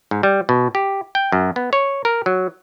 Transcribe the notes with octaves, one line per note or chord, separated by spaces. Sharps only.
G#2
G3
B2
G4
G5
F#2
B3
C#5
A#4
F#3